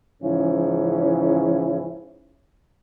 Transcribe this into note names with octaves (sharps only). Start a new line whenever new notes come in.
G#2 C#3 E3 F3 C#4 E4